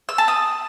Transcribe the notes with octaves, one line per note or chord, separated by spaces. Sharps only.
E6
A5
D#6